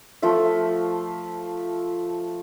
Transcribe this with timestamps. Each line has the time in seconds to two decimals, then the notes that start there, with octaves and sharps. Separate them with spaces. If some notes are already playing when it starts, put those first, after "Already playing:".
0.22 F3 A3 F4 E5